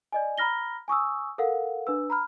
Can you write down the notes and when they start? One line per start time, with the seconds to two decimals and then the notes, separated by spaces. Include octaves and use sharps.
0.12 D5 D#5 G#5
0.38 A#5 B5 F6 A#6 G7
0.88 G#5 C#6 D#6 E6
1.38 A4 A#4 F5 F#5
1.87 D4 B4 E6
2.10 A#5 B5 F6